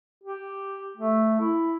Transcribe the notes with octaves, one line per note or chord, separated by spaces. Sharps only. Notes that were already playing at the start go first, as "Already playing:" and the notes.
G4
A3
E4